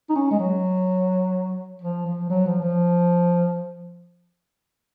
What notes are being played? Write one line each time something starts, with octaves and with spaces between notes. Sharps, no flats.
D#4
C#4
G#3
F#3
F3
F3
F#3
F3
F3